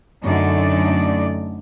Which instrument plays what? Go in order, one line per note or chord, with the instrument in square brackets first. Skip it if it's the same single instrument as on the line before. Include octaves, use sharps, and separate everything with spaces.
[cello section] F#2 D3 A3 D#4 D5